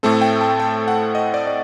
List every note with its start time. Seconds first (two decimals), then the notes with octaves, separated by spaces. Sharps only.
0.03 A2 A3 C4 A4
0.21 G5
0.41 A5
0.60 G5
0.88 F#5
1.15 D#5
1.34 D5
1.47 D5